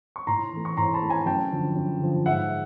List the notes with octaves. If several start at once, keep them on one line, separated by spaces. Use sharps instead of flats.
C#6
A2 A#5 C6
E3 A3
C#6
A2 A#5 C6
A5 B5
E3 A3
G#5 A#5
F#2 G5 A5
D3 F3
F#2
D3 F3
G#2 E5 F#5